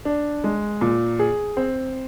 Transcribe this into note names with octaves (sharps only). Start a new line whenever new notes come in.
D4
G#3
A#2
G#4
C4